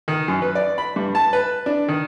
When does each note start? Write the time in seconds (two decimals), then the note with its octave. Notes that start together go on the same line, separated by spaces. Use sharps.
0.08 D#3
0.28 F#2
0.42 B4
0.55 D5
0.78 B5
0.96 G2
1.15 A5
1.33 B4
1.66 D4
1.88 D#3